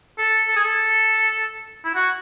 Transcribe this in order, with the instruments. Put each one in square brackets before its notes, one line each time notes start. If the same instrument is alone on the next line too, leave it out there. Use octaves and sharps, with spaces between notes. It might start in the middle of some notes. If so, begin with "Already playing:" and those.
[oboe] A4
A4
G#4
A4
E4
F#4